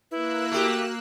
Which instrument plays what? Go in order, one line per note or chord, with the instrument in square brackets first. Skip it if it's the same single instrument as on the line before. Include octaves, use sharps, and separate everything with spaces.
[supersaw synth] A#3 E6 F#6 [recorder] E4 [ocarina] B4
[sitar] A3 G4 [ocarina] F#4